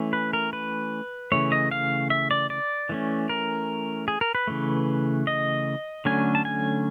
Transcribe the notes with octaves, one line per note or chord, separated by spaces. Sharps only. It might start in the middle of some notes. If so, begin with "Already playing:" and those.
Already playing: E3 A3 C#4
B4
A#4
B4
C#3 E3 A3 C#5
D#5
F5
E5
D5
D5
E3 A3 C#4
A#4
G#4
A#4
B4
C#3 E3 A3
D#5
D3 F#3 A3 C#4 G#5
A5
G#5